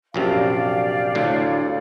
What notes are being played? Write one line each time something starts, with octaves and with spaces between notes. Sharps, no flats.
A#1 F#2 C3 G4 D5 F5
D2 A2